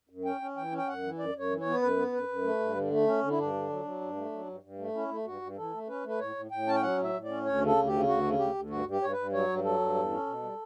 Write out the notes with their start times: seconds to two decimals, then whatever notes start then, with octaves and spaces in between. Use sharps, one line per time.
0.09 F#2
0.25 C#4 G5
0.41 C#4
0.57 E3 G5
0.72 C#4
0.78 G5
0.88 F#2 F#5
1.03 E3
1.19 F#2 D5
1.35 F#2 C#5
1.50 E3
1.61 C#5
1.66 B3
1.82 F#2 B4
1.97 B3
2.13 F#2 B4
2.28 F#2
2.43 A3
2.60 G2
2.75 D3
2.90 A3
3.07 C#4
3.23 D3
3.30 E4
3.38 G2 D4
3.53 D3
3.69 F#3
3.85 F#3
4.01 G2
4.16 A3
4.32 F#3
4.47 G2
4.63 G2
4.79 A3
4.95 C#4 E4
5.10 A3
5.25 G2 F#4
5.42 G2
5.57 E3 A4
5.73 A3
5.88 C#4 B4
6.04 A3 B4
6.19 A2 C#5
6.36 A2
6.51 A2 G5
6.66 C#4 A5
6.74 G5
6.82 F#3 F#5
6.98 A2
7.03 E5
7.14 A2
7.24 C#4 D5
7.45 D2 C#5
7.61 C#3
7.66 A4
7.76 D2
7.87 G4
7.92 C#3
8.07 D2 F#4
8.23 C#3
8.39 D2 G4
8.54 D2
8.70 G2 F#4
8.86 G2
8.91 G4
9.01 G2 C#5
9.12 B4
9.17 G2
9.33 F#3 C#5
9.48 G2
9.64 F#3 A4
9.79 G2
9.95 E2
10.11 C#4
10.26 B2
10.42 G3